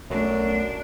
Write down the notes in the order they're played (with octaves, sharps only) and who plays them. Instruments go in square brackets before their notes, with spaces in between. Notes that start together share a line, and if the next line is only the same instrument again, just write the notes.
[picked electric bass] B1 A3 [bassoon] F#2 [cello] D4